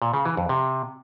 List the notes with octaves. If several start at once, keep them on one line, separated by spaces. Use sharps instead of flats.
A#2
C#3
E3
F2
C3